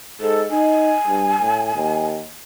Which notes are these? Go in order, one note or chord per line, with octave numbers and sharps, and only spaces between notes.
G#2 A4
D#4 G#5
G2
A2
D#2